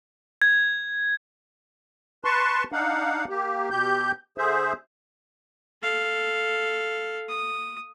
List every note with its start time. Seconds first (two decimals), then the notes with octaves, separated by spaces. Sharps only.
0.42 G#6
2.25 B4 A5 C6 C#6
2.72 D4 D#4 F5 F#5
3.29 A#3 G4
3.71 B2 G4 G6
4.38 D3 G#4 C5 E5
5.82 A4 F5
7.29 D#6